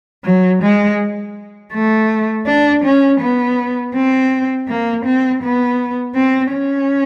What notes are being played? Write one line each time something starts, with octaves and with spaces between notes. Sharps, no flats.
F#3
G#3
A3
D4
C#4
B3
C4
A#3
C4
B3
C4
C#4